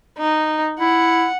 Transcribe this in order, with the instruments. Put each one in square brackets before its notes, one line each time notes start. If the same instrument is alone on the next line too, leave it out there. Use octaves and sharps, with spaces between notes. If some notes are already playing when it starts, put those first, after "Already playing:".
[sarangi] D#4
[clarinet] E4 [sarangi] F#5